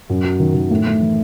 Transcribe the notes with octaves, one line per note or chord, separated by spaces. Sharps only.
F#2
F#3
D#3
D#3
A2
A2
E3